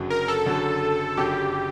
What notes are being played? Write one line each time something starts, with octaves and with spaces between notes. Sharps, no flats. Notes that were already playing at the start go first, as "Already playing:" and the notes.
Already playing: F#1 F#2 D3 F#3
A#4
A4
F#1 F#2 D3 F#3
F#1 F#2 D3 F#3 G4